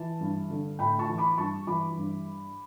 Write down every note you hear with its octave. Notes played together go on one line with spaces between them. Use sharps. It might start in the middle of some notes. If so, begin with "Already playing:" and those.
Already playing: E3 A5
G2
D3
A2 G5 B5
A5 C#6
E3
B5 D6
G2 A5 C#6
E3 B5 D6
G2